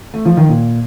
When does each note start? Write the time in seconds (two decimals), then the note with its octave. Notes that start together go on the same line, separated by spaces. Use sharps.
0.14 A3
0.25 F3
0.37 D#3
0.49 A#2